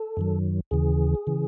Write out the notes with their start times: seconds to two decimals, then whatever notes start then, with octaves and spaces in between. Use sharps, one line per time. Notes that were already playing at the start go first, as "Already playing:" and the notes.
Already playing: A4
0.17 F#2 D#3 F#3
0.71 D#2 C#3 E3 G#4
1.27 C#3 E3